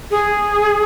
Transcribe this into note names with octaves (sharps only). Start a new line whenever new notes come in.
G#4